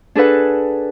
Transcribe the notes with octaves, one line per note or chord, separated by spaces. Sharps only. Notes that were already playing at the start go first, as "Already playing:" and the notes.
D4 G#4 A4 B4 F#5